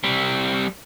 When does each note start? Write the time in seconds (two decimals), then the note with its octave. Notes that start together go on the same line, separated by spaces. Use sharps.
0.04 G3 C4